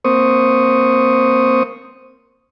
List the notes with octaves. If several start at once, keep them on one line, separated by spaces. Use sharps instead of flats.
A#3 C4 C5 C#6 D#6